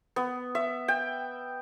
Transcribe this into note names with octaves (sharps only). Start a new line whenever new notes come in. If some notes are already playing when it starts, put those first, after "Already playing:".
B3
E5
G5